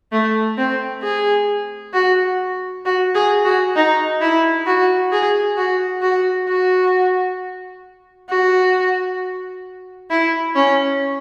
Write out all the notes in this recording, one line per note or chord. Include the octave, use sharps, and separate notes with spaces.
A3
C4
G#4
F#4
F#4
G#4
F#4
D#4
E4
F#4
G#4
F#4
F#4
F#4
F#4
E4
C#4